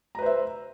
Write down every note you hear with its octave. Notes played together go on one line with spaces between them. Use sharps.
B4 C5 E5 A#5